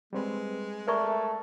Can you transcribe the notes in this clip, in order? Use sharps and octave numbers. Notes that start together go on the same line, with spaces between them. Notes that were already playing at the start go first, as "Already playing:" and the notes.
G3 G#3 C4 B4
A3 A#4 D5 A5 A#5 C#6 F6